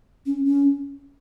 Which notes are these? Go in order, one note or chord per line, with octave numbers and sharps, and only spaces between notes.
C#4
C#4